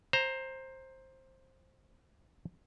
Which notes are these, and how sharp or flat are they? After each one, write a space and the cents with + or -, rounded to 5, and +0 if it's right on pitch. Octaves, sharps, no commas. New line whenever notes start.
C5 +15 A#5 +0